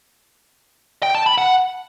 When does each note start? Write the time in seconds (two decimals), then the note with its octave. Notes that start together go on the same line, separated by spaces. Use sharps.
1.03 G5
1.15 A5
1.26 B5
1.38 F#5